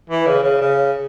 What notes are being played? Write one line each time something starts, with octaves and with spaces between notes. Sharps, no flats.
E3
C#3
C#3
C#3